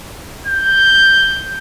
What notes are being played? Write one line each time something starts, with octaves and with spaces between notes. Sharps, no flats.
G6